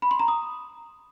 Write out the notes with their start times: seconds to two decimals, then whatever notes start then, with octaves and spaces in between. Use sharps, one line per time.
0.02 B5
0.11 C6
0.20 A#5
0.28 D#6